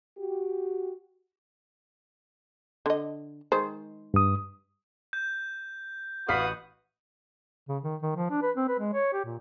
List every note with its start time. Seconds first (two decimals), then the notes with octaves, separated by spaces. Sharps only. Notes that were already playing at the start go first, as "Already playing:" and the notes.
0.18 F#4 G4
2.86 D3 D#5
3.52 D#3 G#3 C5
4.14 G2 D#6
5.13 G6
6.29 A1 F#4 B4 F5 D#6 B6
7.68 C#3
7.83 D#3
8.02 D#3
8.16 F3
8.30 D4
8.42 B4
8.56 C4
8.68 B4
8.79 G#3
8.93 C#5
9.13 G4
9.25 A#2